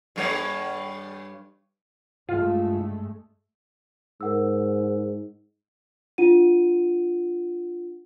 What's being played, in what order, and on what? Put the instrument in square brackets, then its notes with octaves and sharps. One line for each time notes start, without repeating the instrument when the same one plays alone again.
[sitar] G2 G3 C#5
[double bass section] G2 G#3 A3 [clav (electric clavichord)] F4
[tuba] G#2 [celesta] A#4 F#5 E6
[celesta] D4 F4 F#5 D#7